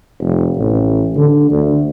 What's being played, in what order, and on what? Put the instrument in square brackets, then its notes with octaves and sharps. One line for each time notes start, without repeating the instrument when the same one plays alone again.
[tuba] F1
A1
D3
D2